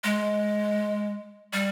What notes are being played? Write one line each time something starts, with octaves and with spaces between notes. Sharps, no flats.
G#3
G3